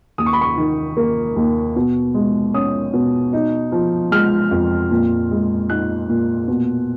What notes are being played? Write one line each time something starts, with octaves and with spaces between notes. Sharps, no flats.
D#2 D#6
C#6
B5
C#6
D#3
A#3
D#2
B2
G#3
C#4 D#6
B2
D#4
F3
G#3 F6
F2
A#2
G#3
D#4 F#6
A#2
B2